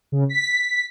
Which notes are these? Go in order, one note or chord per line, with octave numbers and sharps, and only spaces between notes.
C#3
B6